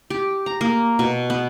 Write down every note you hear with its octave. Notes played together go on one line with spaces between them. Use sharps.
G4
A#5
A#3
B2
B3